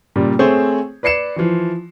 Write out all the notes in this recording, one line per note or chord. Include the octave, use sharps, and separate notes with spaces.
A#2 C#3 G3
A3 C4 G#4 C5 C#5
B4 D5 C7 C#7 E7
E3 F3